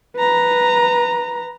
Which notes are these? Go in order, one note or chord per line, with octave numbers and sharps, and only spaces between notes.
B4 A#5